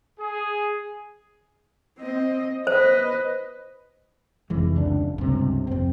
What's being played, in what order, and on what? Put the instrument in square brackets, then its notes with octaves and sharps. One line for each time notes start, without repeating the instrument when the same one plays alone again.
[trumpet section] G#4
[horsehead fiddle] C4 D#5
[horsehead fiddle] B4 D#5 [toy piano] C5
[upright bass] F1 [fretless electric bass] E3 G#3
[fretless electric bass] C#2 D4
[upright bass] C#2 [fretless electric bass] G2 C3
[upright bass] F1 F2 [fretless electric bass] C4